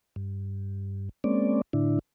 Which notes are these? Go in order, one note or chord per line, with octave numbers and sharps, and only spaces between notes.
G2
G#3 A#3 C4 C#4 D5
A2 D3 D4 E4